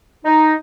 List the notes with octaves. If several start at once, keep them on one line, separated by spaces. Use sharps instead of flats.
D#4